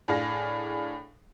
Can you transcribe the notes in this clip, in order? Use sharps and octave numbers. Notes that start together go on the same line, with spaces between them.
A2 D4 G#4 F5 A#6